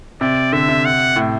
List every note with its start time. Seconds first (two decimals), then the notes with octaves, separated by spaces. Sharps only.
0.21 C3 D5
0.53 D3 E5
0.68 C3
0.85 F#5
1.16 A2